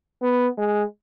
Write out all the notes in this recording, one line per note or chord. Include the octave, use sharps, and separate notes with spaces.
B3
G#3